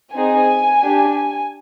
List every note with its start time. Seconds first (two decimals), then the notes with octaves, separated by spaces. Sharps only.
0.13 C4 D#4 G#4 G#5
0.83 D4 G4